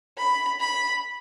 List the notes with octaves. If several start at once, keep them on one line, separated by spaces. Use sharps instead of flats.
B5
B5